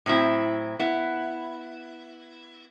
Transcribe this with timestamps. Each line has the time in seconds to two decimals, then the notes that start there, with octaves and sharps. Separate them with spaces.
0.06 A2 F#3 C4 E4
0.79 B3 E4